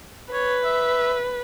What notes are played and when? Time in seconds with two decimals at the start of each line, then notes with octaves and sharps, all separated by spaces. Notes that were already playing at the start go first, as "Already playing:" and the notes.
0.33 B4 C#5
0.64 E5